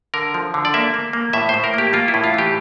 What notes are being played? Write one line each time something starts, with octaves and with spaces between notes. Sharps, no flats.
D3 A#4
F3
D3
D5
A#3 E5
A#3
A#3
A2 E5
C5
A2
A#4
A#3 G4
A#3 F4
E4
A2
F4
E3 G4